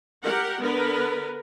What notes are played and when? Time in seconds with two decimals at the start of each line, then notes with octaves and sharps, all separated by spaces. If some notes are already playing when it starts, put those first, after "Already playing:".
0.24 G4 A#4 F#5
0.60 D3 B3 A#4 B4